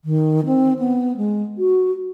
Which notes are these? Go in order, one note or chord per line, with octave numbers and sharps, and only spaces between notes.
D#3
C4
B3
G#3
F#4